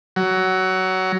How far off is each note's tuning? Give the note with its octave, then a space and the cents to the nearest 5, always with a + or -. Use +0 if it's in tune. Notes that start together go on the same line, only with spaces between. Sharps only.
F#3 +15